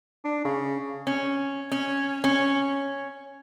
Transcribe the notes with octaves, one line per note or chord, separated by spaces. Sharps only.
D4
C#3
C#4
C#4
C#4